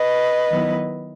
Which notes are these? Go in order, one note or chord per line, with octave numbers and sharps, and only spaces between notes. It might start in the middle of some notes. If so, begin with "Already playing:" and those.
Already playing: B4 D#5
D#3 F#3 B3 E4